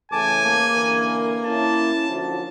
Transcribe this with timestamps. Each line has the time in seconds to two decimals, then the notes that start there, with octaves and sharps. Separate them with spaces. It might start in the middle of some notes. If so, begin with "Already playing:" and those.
0.12 C#3 E3 A3 G#5 A5 D6
0.44 A#3
0.75 D3 E3 A#4
1.46 C#4 E4 A5
2.08 D3 F3 F#3